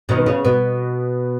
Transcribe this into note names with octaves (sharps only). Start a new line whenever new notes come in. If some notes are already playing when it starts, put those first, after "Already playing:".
B2 D#3
B3
C#3
B2 B3